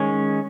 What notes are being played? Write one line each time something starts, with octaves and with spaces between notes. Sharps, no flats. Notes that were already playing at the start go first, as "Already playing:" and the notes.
Already playing: D#3 G#3 C#4 C#5